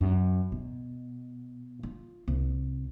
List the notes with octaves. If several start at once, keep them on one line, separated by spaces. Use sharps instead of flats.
F#2
B2
F4
C2